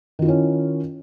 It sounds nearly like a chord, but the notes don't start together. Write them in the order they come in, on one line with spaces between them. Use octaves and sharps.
D#3 F4 E4 C#4